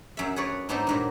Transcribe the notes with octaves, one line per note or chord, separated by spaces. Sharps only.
F#2 E5
G#4 B4 C#5 D5
G#2 B3 D4 D#4 A4 C5
G2 A#2 F#3